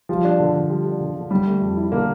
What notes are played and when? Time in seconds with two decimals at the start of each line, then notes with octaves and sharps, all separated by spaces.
0.09 F3 G3
0.24 D4
0.40 D3
0.55 D3
0.70 G3
0.85 D4
1.00 D3
1.16 D3
1.31 D3 G3
1.46 A3
1.61 F2
1.77 E4
1.92 D3 A#3